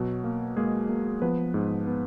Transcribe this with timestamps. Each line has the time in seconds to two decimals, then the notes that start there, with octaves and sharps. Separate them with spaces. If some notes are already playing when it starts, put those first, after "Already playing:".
Already playing: B2 F#3 F#4
0.24 A#3
0.57 G#3 A#3 G#4
0.89 A#3
1.22 F3 B3 B4
1.54 G#2
1.87 B3